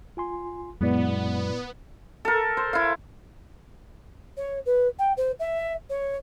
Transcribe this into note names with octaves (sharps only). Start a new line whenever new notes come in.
F4 G#5 C6
F#2 A#2 G#3 B3 E4 D5
A4 A#4
C5
E4 F5
C#5
B4
G5
C5
E5
C#5